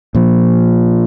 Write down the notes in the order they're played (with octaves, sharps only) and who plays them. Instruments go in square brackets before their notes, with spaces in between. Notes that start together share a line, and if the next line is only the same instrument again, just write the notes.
[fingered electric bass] A#2 F3